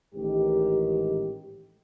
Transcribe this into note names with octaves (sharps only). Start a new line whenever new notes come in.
A1 G#2 D#3 G4